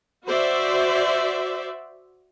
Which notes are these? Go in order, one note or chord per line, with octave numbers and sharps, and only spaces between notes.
F#4 C5 D5 E5